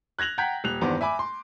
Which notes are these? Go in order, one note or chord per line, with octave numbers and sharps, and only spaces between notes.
F#6 G#6 A#6 F7 F#7
F#5 G5 A#5 G6 G#6 B6
D#1 F#6 F7
E2 G2 D#3 B3 C5 D6
E5 G#5 B5 D6
C6